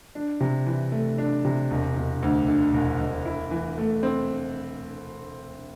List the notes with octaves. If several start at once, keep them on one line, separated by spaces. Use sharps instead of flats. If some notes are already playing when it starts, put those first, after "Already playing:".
D4
C3
E3
A3
D4
C3
E1
E1
D2
D3
E1
E1
E4
E3
A3
C4